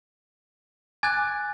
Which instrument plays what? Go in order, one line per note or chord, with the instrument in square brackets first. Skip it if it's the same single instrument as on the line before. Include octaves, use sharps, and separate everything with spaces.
[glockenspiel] G#5 F#6 [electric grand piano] D6 G#6 A6